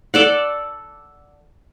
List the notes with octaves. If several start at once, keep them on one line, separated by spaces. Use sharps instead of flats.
A4 D5 F#5